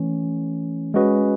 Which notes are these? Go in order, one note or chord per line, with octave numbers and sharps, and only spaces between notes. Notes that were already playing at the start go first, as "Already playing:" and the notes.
Already playing: E3 A3 C#4
G#3 C#4 F#4 B4 D#5